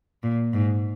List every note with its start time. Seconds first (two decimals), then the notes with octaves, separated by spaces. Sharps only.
0.23 A#2
0.53 G#2